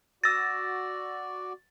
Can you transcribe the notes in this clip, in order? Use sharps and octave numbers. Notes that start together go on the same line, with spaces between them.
F#4 D5 E6 A6 A#6